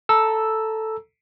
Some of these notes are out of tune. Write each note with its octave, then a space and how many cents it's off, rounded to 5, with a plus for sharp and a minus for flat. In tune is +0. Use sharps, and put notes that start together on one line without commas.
A4 +0 A#5 +15 E6 +0